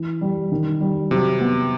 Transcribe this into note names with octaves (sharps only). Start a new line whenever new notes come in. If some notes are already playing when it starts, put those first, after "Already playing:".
Already playing: E3
G3
D#3
G3
C3 F#3
B3